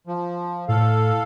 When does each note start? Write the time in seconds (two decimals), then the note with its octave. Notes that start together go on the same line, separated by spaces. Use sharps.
0.07 F3
0.69 A2 A4 F5